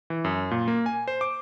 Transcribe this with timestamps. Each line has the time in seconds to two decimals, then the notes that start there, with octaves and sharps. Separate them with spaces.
0.10 E3
0.24 F#2
0.51 A#2
0.68 A#3
0.86 G#5
1.08 C5
1.21 D6